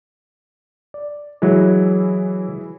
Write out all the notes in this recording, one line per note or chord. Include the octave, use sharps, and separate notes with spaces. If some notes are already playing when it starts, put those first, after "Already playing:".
D5
E3 F#3 G#3 E4 G#4